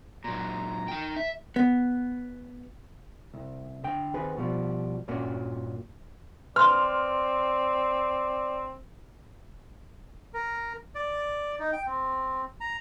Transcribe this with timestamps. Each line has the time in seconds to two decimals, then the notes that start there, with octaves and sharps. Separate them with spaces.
0.24 A#2 F#3 A#5
0.88 D#4 G5
1.16 E5
1.56 B3
3.33 C2
3.84 D3 G5
4.14 D#2 C4 G#4 B4
4.37 B2 F3 G3
5.08 G2 A#2 A#3 C#4 F#4
6.56 C4 B4 D5 C6 F6
10.34 A#4
10.95 D5
11.60 D#4
11.73 G5
11.86 C4
12.60 A#5